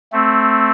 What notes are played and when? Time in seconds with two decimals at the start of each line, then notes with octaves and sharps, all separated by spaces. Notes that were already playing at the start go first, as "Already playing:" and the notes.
0.13 A3 C4